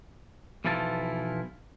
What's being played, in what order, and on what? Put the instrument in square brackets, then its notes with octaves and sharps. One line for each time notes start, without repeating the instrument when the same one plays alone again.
[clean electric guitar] B1 E3 F3 E4 F4 A5